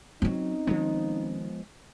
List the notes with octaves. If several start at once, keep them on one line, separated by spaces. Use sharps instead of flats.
F#3 C4 C#4 D#4
D#3 F3 G#3 B3